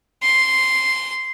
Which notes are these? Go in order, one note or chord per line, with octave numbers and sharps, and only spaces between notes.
C6